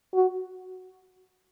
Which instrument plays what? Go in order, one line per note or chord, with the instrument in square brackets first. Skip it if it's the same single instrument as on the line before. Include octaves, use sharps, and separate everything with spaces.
[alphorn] F#4